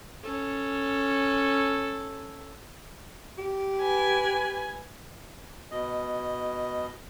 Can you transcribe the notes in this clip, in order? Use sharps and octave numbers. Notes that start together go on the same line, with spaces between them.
C#4 A4
G4
B4 G#5
B2 D#5